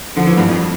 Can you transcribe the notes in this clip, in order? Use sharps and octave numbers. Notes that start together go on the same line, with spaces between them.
D3 F3
E3
G2
F2